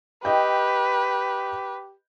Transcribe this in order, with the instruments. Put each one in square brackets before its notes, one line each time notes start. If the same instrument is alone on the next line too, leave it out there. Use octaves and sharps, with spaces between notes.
[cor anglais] G4 [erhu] B4 [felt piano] D#5 G5